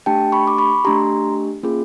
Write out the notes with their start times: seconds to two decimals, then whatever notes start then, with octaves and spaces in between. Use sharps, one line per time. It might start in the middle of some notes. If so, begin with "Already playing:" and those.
0.06 A3 D4 G4 G5 A5
0.32 B5 C#6
0.47 D6
0.58 B5 C#6
0.85 A3 D4 G4 A#5 C6
1.63 A#3 C#4 F4 G#4